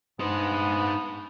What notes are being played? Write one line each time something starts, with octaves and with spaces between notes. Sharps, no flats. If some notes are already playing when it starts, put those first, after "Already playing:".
G2 B3 D#4 C5